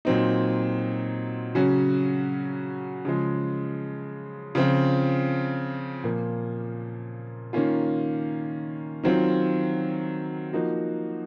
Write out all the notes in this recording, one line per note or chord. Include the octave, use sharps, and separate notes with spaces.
A#2 F#3 C4 D#4
C#3 F#3 C#4 F#4
C#3 F3 G#3
C#3 F3 C4 F4
A#2 F3 A#3
D#3 A#3 C#4 F4
D#3 F#3 C4 F4
F3 A#3 D#4 F#4